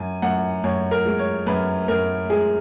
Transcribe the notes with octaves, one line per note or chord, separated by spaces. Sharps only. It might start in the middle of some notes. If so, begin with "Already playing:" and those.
Already playing: F#2 G#5
F#2 F#5
F#2 C#5
A#4
G#3
C#5
F#2 B4
F#2 A#4
G#3 G#4